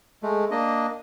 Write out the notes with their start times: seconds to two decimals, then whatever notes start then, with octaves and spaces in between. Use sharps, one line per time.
0.23 G#3 A3
0.51 A#3 D4 D#5